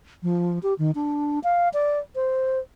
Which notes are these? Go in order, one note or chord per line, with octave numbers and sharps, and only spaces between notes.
F3
G4
D#3
D4
F5
D5
C5